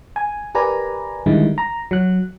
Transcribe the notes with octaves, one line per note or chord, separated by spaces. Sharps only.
G#5
G4 A#4 B4 D5 G#5 A#5
D3 D#3 G3 G#3 D#4 E4
A#5
F#3 F#6